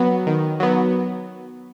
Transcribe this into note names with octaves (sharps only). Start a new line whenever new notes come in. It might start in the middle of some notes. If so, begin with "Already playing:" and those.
Already playing: F#3 B3
D#3
F#3 B3